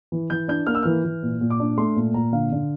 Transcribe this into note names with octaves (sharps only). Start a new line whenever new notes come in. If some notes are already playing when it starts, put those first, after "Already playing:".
E3
E3 G6
D4 G6
A#3 F6
E6
E3 F6
E3
A#2
A#2
D6
D4
A3 C6
A#2
A#2 A#5
D3 F5
D3